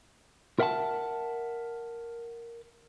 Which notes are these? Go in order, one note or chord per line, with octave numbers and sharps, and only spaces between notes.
A#4 E5 F#5 G#5 A5